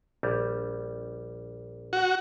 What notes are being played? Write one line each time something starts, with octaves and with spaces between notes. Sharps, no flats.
A#1 G3
F#4